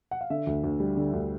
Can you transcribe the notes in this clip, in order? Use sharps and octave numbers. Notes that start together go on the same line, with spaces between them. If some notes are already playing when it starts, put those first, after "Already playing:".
F#5
F5
D3 E5
D2
D2
G3
D3
D2